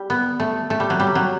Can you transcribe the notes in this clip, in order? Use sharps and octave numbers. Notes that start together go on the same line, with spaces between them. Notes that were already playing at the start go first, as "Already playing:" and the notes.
Already playing: G3
B3
A3
A3
G3
F#3
G3
F#3